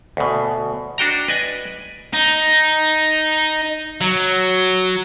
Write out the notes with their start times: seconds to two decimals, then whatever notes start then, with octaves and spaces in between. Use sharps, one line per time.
0.17 D2 B2
0.98 D4 F#4 G5 A#5
1.28 B4 D5 D#5 G#5
2.14 D#4
4.01 F#3